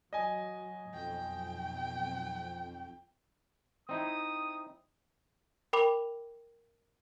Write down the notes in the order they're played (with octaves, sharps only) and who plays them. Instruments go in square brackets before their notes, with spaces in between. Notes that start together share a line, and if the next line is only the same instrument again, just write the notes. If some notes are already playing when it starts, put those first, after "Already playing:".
[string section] F#3 [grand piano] D#5 G#5
[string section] B1 [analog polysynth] F2 [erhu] G5
[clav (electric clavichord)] C4 D#4 E4 [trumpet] D#6
[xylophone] A#4 G5 B5 D6 F7